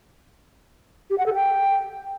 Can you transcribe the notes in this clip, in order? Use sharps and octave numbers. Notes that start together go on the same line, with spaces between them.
G4
F#5
A4
G5